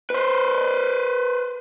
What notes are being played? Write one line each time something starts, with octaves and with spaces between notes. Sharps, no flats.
B4 C5